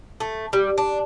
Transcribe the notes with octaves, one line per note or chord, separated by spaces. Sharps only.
A3
G3
D4